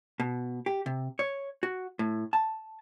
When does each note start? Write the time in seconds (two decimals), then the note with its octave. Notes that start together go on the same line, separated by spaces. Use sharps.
0.20 B2
0.66 G4
0.86 C3
1.19 C#5
1.63 F#4
1.99 A2
2.33 A5